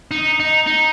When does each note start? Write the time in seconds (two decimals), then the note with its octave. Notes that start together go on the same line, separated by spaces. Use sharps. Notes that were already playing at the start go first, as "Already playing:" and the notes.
0.11 D#4
0.40 D#4
0.67 D#4